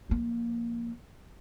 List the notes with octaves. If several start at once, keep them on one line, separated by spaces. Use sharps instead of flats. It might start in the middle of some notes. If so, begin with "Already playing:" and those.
F3 A#3